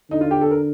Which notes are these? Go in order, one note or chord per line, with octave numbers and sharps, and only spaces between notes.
D3 D#4
F4
G4
A4
A#4